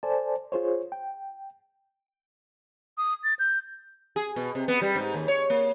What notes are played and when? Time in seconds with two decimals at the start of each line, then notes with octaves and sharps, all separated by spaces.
0.03 A4 C5 D5 G#5 A5
0.52 F4 G#4 C5 C#5
0.92 G5
2.98 D#6
3.24 A6
3.39 G6
4.16 G#4
4.36 B2
4.55 C3
4.68 B3
4.82 G3
4.96 G#2
5.14 D#2
5.28 C#5
5.50 A#3